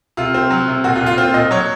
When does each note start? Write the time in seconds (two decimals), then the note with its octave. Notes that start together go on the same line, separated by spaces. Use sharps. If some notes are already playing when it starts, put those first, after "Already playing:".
0.17 C3 F4
0.34 C4
0.50 F#3
0.68 C3
0.84 A#2 F#4
0.95 F4
1.01 A#2
1.06 F4
1.17 C4 F4
1.34 A#2 D#5
1.51 F#3 C#5